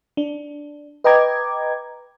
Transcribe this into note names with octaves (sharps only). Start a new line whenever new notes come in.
D4
B4 D#5 G5 A#5 D6 G#6